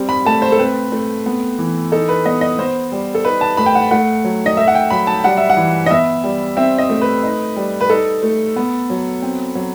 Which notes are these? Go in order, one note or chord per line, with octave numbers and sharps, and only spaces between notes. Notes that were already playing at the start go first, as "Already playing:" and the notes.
Already playing: G3 C4
B5
A3 A5
C5
A4
C4 B4
A3
B3
E3
D#4 A4
B4
B3 D#5
D#5
B3 C5
G3
A4
D#4 B4
A5
A3 B5
G5
F#5
A3 F#5
F#3
D#5
A3 E5
F#5
G5
F#3 B5
A5
G3 F#5
E5
F#5
E3
D#5
B3 E5
G3
C4 E5
D#5
A3
B4
D#4
G3
B4
D#4 A4
A3
B3
F#3
C4
F#3